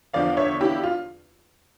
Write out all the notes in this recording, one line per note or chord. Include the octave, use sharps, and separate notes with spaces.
E2 D3 F3 D5 F5
C#5 E5
E4 G4
F4